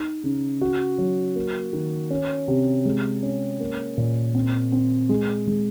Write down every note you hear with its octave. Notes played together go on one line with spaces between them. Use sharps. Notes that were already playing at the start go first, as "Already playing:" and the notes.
Already playing: D#4
C#3
F#4
F#3
A#3
D#3
C#4
C3
G#3
C#4
A#3
A#2
C4
C4
G#3
G#3